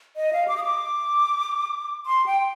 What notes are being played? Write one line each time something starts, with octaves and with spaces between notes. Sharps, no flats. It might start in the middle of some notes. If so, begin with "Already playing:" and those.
D#5
F5
D6
D#6
D6
C6
G5